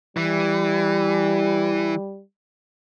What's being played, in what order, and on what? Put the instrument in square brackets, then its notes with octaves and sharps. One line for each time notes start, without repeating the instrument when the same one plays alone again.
[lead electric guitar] E3 [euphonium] G3